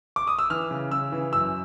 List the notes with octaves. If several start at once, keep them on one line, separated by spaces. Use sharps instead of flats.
D6
D#6
E6
E3 F6
C#3
C#3 E6
E3
F#2 E6